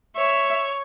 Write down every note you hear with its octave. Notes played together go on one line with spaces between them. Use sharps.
C#5 E5